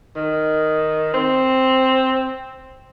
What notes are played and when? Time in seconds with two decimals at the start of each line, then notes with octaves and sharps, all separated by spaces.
0.16 D#3
1.14 C4